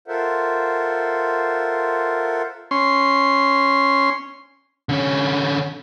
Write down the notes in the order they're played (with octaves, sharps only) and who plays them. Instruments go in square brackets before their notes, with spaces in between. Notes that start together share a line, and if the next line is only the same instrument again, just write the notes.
[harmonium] F4 A4 A#4 C5 E5 F#5
[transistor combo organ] C#4 C6
[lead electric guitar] D3 C#4